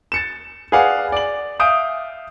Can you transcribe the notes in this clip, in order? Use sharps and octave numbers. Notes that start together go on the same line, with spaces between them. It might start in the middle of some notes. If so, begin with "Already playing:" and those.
A6 C#7 E7
G#4 B4 D5 F5 F#5
D5 F#7
E5 F5 D#6 G6 D7 D#7